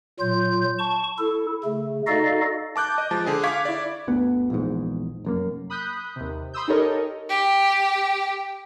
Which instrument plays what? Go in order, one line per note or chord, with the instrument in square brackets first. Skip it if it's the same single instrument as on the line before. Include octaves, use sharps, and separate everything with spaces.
[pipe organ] A#2 F#3 F4 G6
A5 C#6
E4 A4
C#3 A3
D#4 F#4 A4 D5 D#5 F5
[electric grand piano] A5 D6 F#6 G6
D#5
F3 G#3 A5
D3 G#4
F5 C#6 D6 G#6 B6
E4 D5
[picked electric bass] G1 D2 B3
A#1 E2 G#2
F1 F#2 A#3
[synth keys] B5 D#6 F#6 G6 B6
D#2 C3
B5 C6 D#6 E6 G6
D#4 G4 A4 A#4 C#5 D#5
[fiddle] G4